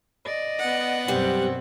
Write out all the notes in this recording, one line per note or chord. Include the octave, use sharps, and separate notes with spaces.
D5 D#5
B3 F#5
F#2 B2 G3 C4